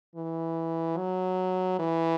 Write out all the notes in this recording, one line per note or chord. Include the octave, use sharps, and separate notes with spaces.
E3
F#3
E3